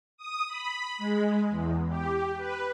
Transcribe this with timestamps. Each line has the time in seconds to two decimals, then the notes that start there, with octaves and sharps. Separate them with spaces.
0.17 D#6
0.48 B5
0.98 G#3
1.50 E2
1.88 G4
2.37 B4